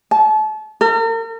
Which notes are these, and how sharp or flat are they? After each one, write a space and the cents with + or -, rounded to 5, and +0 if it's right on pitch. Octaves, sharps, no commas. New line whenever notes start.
A5 -35
A#4 -40